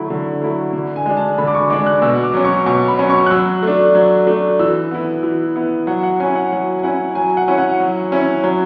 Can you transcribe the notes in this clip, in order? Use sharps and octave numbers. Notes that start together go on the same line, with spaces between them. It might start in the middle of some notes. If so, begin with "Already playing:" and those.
Already playing: D3 F#3 A3 E4 B5
D3
F#3 A3 E4
D3
G#5
G#3 D4
A5
D3 B5
D6
C#6
G#3 D4 D6
F#6
B2 E6
D6
F#3 C#4
C#6
B2 C#6
B5
F#3 C#4
C#6
F#6
F#3 E6
A3 D4
F#3
A3 D4
E3 E6
B3 E4
E3
B3 E4
F#3 F#5
F#5
C#4 E4 G#5
F#5
F#3 F#5
G#5
C#4 E4 F#5
F#3 G#5
F#5
C#4 E4
F#5
F#3
C#4 E4
F#3